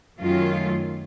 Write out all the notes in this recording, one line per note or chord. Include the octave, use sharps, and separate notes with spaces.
F#2 D#3 F#3 A3 F4